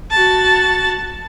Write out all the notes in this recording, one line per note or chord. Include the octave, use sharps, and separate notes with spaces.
F#4 A5